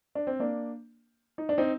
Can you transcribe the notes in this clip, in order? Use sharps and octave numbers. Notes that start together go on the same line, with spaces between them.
D4
C4
A#3 D4
D#4
D4
C4 D#4